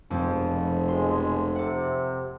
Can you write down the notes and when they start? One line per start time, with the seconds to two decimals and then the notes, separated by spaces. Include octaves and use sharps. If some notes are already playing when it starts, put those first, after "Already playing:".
0.10 F1 F2 B2 G#3 C4
0.88 B2 G#3 C6
1.56 C3 A4 F#5